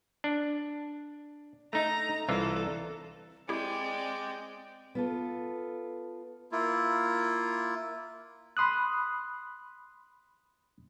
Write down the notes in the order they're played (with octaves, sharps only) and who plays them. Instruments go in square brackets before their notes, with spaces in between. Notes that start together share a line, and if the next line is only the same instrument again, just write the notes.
[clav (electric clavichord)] D4
[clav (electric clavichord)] A3 D#4 [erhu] A#5
[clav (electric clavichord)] C2 E3 F4 [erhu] A4
[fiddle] G#3 [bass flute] C4 [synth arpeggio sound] E4 G4 [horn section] D5 G5
[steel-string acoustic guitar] B3 F4 A4
[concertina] A#3 E4 F4
[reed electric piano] B5 C6 D#6 F#6